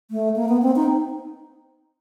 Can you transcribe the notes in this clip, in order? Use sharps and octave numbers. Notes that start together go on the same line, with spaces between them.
A3
A#3
B3
C4
D#4